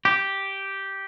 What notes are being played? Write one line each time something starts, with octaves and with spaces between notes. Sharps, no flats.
G4